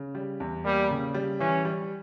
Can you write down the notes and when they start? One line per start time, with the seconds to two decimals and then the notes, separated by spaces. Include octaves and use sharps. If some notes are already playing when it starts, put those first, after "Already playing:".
Already playing: C#3
0.15 G3
0.40 E2
0.65 G3 A#3
0.90 C#3
1.14 G3
1.40 E3 C#4
1.65 G3